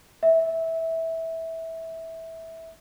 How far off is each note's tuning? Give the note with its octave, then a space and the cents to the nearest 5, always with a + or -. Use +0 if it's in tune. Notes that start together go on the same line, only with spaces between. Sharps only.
E5 -15